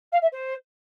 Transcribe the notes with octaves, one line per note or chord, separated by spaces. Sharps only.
F5
E5
C5